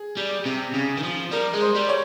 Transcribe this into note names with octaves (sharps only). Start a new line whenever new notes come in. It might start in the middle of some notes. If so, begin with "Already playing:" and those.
Already playing: G#4
G3
C3
C#3
D#3
F3
G3 A#4
G#3
C5
G3
C#5